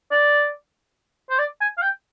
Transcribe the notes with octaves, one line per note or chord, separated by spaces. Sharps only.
D5
C5
D5
G#5
F5
G5